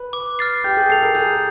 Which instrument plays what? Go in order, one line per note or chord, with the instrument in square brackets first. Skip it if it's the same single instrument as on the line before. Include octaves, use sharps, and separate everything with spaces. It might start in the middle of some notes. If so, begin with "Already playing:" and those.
Already playing: [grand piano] B4
[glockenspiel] D6
F6 A6 C7
[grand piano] G4 [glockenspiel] G6
[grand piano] G#4
[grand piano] A4 [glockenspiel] C7 F7
[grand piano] A#4
[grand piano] G#4 [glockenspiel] G6